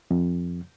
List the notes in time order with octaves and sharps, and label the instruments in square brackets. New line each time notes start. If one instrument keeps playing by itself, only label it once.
[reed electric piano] F2